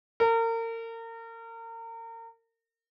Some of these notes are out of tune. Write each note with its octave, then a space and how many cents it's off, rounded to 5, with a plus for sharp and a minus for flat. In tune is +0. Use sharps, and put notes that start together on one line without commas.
A#4 -35